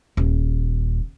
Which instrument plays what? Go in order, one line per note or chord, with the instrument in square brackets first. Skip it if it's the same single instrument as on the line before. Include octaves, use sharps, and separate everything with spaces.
[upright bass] D#1